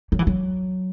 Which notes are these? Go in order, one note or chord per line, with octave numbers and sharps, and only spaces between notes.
F#3
E3
F#3